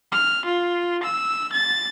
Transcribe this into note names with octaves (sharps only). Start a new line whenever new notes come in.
F6
F4
E6
A6